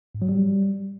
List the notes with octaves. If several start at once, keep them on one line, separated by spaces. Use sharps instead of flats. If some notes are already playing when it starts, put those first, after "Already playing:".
G#2
F#3
G3